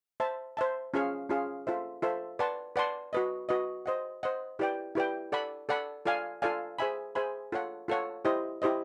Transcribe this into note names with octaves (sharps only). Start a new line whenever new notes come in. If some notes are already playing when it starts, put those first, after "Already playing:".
C5 E5 A5
C5 E5 A5
C#4 F4 G#4 C#5 F5
C#4 F4 G#4 C#5 F5
F4 A4 C5 E5
F4 A4 C5 E5
B4 D5 F#5 A5 C6
B4 D5 F#5 A5 C6
F#4 B4 D#5
F#4 B4 D#5
C5 D#5 F#5
C5 D#5 F#5
E4 G4 B4 D5 G5
E4 G4 B4 D5 G5
A4 D5 F#5 B5
A4 D5 F#5 B5
F4 A4 D5 F5 G#5
F4 A4 D5 F5 G#5
G#4 C5 E5 G#5 B5
G#4 C5 E5 G#5 B5
F4 A4 C#5 F#5
F4 A4 C#5 F#5
E4 G4 C5 D#5
E4 G4 C5 D#5